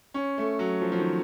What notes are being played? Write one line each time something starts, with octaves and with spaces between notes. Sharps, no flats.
C#4
A3
F#3
F3
F3
D#3